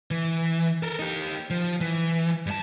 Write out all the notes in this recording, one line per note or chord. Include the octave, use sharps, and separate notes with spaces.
E3
A4 A#4
D#4 G4
F3
E3
G2 A5